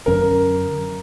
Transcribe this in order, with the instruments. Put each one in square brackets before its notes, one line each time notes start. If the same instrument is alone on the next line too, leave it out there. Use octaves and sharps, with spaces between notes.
[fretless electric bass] F#2 D3 F#3 C#4 [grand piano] A#4